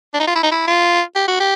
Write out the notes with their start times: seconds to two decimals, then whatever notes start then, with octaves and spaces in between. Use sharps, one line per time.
0.14 D4
0.20 D#4
0.28 F4
0.36 E4
0.43 D#4
0.51 E4
0.68 F4
1.16 G4
1.28 F#4
1.40 G4